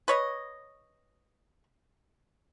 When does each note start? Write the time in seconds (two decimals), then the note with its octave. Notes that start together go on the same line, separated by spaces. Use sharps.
0.08 B4 C#5 D#5